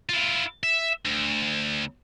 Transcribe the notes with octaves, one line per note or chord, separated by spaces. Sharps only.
E4 F4
E5
D2